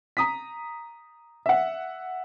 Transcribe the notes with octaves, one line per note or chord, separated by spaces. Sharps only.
A#5 D#6 B6
E5 F#5